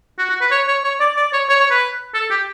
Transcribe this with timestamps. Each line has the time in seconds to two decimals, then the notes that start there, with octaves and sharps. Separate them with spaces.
0.19 F#4
0.30 F#4
0.41 B4
0.51 C#5
0.68 C#5
0.84 C#5
1.00 D5
1.17 D5
1.33 C#5
1.49 C#5
1.60 C#5
1.71 B4
2.14 A4
2.31 G4